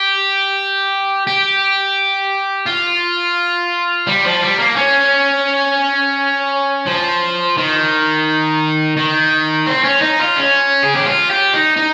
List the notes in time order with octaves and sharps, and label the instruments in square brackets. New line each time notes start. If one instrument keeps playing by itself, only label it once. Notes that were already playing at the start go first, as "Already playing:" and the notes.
Already playing: [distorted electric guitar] G4
G4
F4
G3
F3
G3
A#3
C#4
F3
D#3
D#3
C4
C#4
D#4
F4
C#4
G#4
G4
F4
G4
D#4
D#4